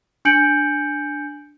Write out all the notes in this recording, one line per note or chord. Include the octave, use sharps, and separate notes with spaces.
D4 G#5 G6 C#7 D7 F#7